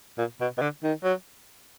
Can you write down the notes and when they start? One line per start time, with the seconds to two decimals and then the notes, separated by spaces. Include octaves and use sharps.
0.18 A#2
0.40 B2
0.58 B2
0.61 D3
0.83 D#3
1.04 F#3